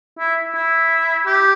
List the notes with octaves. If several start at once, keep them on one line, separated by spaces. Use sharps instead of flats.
E4
E4
G4